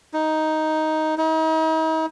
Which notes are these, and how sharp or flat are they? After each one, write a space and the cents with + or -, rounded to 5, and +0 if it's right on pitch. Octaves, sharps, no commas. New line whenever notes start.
D#4 +5
D#4 +40